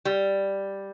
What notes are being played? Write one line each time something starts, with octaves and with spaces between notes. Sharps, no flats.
G3